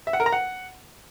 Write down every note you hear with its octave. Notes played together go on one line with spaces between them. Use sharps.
E5
F#5
A#4
A#5
F#5